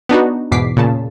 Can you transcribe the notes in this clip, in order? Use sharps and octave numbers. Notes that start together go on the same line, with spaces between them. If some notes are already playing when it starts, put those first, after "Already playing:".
B3 D4 D#4 F#4
E2 G#2 B2 D6 B6 C7
A#2 C#3 A5